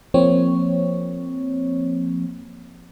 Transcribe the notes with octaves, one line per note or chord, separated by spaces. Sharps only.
F3 A#3 C4 C#5